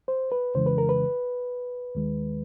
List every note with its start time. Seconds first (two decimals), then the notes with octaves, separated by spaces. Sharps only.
0.08 C5
0.32 B4
0.55 F2 C#3 E3 G#3 C5
0.66 B4
0.78 A#4
0.89 B4
1.95 D#2 D#3 G#3